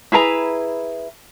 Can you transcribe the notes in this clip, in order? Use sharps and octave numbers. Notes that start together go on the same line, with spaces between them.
E4 G#4 B4 A#5